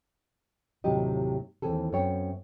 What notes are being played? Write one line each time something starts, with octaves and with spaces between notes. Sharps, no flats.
D#2 A2 C3 F#3 G4 D#5
D#2 E3 C4 G#4 A4
F#2 B3 C4 C#5 G5